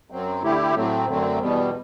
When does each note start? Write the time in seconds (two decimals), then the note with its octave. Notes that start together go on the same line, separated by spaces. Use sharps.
0.10 F#2 F#3 C4
0.43 D3 A3 E4 G4
0.75 A2 F#3 A3 C4
1.07 F#2 D3 F#3 A3 C4
1.39 E2 B2 G3 B3